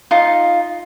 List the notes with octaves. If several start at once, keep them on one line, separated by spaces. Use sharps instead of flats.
D#4 F4